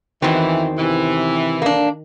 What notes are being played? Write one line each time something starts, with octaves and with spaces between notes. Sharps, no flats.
E2 D#3 E3 C4 F#4
C3 E3
A#3 D4